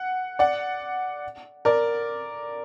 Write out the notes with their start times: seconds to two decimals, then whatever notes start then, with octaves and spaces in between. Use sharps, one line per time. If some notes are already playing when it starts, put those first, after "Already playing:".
Already playing: F#5
0.39 D5 F#5
1.65 A#4 D5